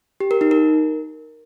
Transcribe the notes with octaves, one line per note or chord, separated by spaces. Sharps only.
G4
A#4
D#4
A#4